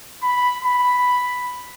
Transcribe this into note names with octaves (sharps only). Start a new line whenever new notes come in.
B5
B5